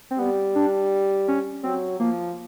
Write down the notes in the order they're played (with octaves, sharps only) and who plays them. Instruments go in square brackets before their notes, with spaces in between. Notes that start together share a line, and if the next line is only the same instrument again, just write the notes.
[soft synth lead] C4
[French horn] G3 [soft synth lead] B3
[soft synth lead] D4
C#4
[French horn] F#3 [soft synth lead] C4
[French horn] F3 [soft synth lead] A#3